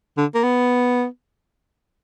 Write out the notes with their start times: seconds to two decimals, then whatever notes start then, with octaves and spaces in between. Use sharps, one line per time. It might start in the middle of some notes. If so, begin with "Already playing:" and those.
0.18 D3
0.35 A#3
0.43 B3